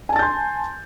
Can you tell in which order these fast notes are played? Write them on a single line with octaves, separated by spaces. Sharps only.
G#5 A5 A6 G6 C6